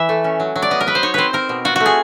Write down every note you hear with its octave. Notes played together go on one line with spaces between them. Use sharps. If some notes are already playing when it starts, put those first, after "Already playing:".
Already playing: E3 E5
A3
C#4
F#3
F#3
D5
B3 D#5
A#4
F#3 B4
C5
D#4 C#5
C4 B4 C5
C4 A#4
B2
F4 F#4
A3 F#4
G#4